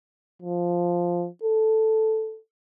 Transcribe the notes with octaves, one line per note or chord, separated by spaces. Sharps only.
F3
A4